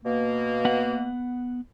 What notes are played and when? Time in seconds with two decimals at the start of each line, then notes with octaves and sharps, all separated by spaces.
0.05 B2 A#3
0.65 B3 F#5